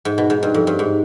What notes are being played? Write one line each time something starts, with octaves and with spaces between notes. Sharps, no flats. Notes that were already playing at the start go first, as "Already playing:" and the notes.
G#2
B2
G#2
G2
F2
G2
G#2